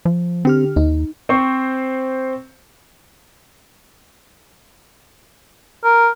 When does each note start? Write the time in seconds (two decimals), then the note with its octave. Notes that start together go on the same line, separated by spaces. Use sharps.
0.05 F3
0.45 D3 C4 G4 F6
0.76 D#2 D#4
1.29 C4 C5 C#6
5.84 A#4